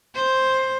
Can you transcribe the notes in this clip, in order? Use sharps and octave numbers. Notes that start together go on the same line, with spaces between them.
C5